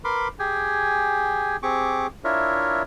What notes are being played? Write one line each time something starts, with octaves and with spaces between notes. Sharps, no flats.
A#4 B4 B5 C6 D6
G4 G#4 G5 G#5
C4 G4 G#4 C#6 D6
D4 E4 F4 A#4 C#5 E5